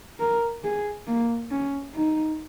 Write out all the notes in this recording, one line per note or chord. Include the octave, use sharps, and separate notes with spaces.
A#4
G#4
A#3
C#4
D#4